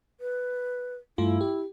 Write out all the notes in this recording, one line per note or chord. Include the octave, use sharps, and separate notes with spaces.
B4
G2 A3 E4 F4
G4